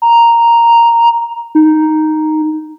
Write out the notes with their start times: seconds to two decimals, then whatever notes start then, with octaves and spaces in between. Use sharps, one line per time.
0.02 A#5
1.55 D#4